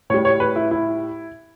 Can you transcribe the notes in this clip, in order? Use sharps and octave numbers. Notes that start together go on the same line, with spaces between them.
A2 G3 C#5
C#5
B4
E4
E4